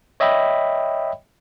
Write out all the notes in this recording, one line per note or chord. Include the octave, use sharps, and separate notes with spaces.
C#5 D#5 E5 G5 B5